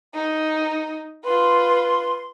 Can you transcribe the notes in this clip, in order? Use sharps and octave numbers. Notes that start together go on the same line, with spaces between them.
D#4
F4 B4 C6